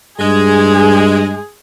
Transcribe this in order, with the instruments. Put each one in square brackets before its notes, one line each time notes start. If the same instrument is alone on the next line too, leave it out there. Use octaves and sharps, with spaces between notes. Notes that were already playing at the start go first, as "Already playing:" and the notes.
[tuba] G2 [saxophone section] G#3 [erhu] G#4